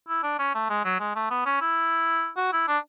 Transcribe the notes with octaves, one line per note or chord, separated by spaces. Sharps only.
E4
D4
C#4
A3
G#3
F#3
G#3
A3
B3
C#4
E4
F#4
E4
D4